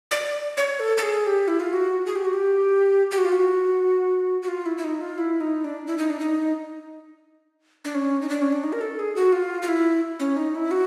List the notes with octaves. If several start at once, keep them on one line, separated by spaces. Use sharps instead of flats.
D5
C#5
A4
A4
G#4
G4
E4
F4
F#4
G#4
G4
F#4
G4
G4
F#4
F4
F#4
F#4
F4
E4
E4
D#4
F4
E4
D#4
D4
E4
D#4
D4
D#4
D4
C#4
D#4
D4
C#4
D4
D#4
A#4
A4
G#4
F#4
F4
F4
E4
C#4
D#4
E4
F#4